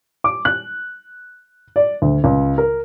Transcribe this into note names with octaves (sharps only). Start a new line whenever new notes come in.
D6
F#6
D5
D2
C#2
A#4